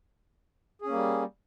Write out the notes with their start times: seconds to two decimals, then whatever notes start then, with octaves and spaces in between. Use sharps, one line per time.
0.82 G#4
0.85 C#4
0.89 A#3
0.93 G3